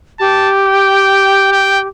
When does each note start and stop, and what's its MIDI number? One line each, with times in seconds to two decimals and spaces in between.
0.20 1.87 67
0.20 0.50 81
0.66 1.52 79
1.52 1.80 79